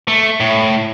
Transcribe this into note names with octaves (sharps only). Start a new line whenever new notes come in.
A3
A2